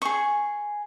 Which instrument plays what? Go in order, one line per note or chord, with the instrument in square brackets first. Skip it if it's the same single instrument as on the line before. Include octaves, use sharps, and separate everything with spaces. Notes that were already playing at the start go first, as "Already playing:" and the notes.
[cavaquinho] G#4 C#6